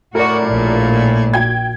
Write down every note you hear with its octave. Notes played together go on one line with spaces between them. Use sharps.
A2 F#4 A#4 D5
A#1 A#2
G5 G#6